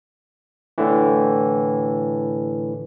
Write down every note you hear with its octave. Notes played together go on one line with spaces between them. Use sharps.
A2 D3 E3